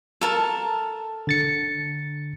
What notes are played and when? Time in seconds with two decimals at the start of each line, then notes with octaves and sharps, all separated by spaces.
0.21 A4 A#4 A5
1.27 D3 A6 C#7